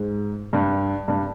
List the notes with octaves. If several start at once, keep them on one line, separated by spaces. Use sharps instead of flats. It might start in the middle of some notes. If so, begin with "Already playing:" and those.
Already playing: G#2
G2
G2